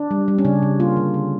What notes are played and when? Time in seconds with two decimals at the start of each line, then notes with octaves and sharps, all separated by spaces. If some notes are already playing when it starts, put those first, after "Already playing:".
Already playing: D4
0.11 G3
0.28 G3
0.38 C#4
0.45 C#3 D4
0.63 C#3
0.80 A#3 F4
0.97 D3
1.14 D3